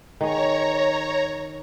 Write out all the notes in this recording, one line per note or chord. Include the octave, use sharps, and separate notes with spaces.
D#3 G#4 C#5 A#5